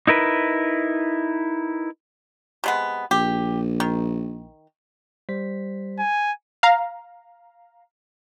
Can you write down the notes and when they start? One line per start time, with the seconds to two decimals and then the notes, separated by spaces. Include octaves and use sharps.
0.07 D#4 E4 A#4 B4
2.64 C3 G#3 B3
3.11 A#1 G4
3.80 D#3
5.29 G3 C5 B6
5.99 G#5
6.63 F5 A#5